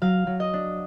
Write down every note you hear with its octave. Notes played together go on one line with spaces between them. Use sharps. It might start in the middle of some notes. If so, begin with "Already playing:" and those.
F#3 F5
F#3
D#5
D4